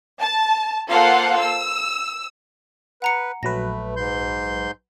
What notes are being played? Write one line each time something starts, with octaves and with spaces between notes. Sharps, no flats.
A5
A#3 F4 A4 C5 F5 F#5
E6
B4 F#5 A#5 C#7
A#1 F#3 A3 B4 A#6
G#2 C6 G6